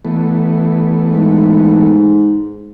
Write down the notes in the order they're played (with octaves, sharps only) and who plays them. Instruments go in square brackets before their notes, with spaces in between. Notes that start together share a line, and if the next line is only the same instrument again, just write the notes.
[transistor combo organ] E3 A3 B3
[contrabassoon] G#2